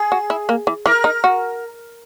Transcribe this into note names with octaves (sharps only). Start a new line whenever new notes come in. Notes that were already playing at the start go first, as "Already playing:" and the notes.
Already playing: G#4
F#4
E4
A#3
E3
E3 A#4
D#4
F#4